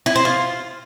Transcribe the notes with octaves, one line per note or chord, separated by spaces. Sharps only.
E4
C5
F4